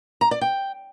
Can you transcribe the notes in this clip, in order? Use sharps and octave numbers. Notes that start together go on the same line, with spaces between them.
A#5
D5
G5